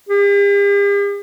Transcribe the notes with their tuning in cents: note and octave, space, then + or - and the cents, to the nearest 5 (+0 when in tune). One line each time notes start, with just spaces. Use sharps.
G4 +45